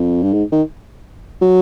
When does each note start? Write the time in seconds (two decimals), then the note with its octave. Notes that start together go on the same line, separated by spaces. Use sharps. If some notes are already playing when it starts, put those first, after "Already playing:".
Already playing: F2
0.23 G2
0.33 G#2
0.52 D#3
1.42 F#3